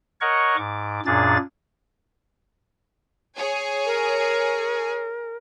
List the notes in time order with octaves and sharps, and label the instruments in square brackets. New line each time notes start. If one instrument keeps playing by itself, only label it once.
[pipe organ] A#4 C#5 D#5 F#5 C#6
G#2 D6
F#2 A#2 D4 G#4 A6
[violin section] G#4 C#5 G#5
[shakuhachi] A#4